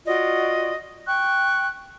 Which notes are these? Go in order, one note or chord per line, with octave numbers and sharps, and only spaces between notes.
F4 F#4 D5 D#5
G5 C#6 F#6